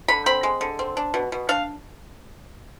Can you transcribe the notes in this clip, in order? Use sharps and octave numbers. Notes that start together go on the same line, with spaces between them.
D3 B5
C4 B5
G#3
D3
C4
D4
B2
B2
D4 F5